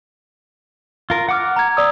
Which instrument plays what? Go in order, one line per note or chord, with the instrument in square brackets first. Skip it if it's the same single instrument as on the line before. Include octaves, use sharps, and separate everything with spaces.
[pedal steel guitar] F4 A#4
F#5 D6 F6
[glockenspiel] A#5 G#6
[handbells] D5 D#6 E6